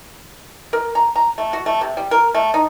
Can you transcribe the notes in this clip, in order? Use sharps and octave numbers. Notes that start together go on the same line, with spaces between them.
A#4
A#5
A#5
A3
F#4
A3
C3
G3
A#4
A3
D#4